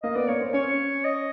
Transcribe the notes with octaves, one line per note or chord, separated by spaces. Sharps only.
A#3 D#5
B3 D5
A#3 C#5
C4
C#4 C#5
D#5